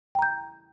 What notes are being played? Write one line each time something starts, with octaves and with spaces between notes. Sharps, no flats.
G5 A#5 G6